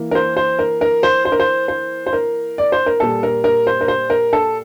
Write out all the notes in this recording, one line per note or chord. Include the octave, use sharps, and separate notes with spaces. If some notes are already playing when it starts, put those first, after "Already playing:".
Already playing: E3 A#3
A#4
C5
C5
A#4
A#4
C5
C5
A#4
C5
C5
C5
A#4
D5
C5
A#4
A#2 G3 A#3 A4
A#4
A#4
C5
A#4
C5
A#4
A4